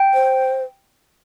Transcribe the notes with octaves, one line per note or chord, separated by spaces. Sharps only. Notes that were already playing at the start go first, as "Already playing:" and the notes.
Already playing: G5
C5